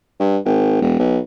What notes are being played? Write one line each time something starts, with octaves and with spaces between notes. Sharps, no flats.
G2
G#1
E1
B1